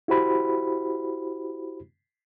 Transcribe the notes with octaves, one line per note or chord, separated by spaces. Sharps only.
E4 F#4 G4 C5 B5